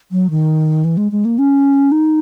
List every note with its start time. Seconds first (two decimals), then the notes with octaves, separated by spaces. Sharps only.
0.12 F#3
0.30 D#3
0.84 E3
0.97 G#3
1.12 G#3
1.25 A#3
1.38 C#4
1.91 D#4